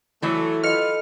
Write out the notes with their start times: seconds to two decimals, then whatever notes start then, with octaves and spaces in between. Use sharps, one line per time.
0.22 E3 F#3 A3
0.64 F4 A4 B4 D#5 F6 C#7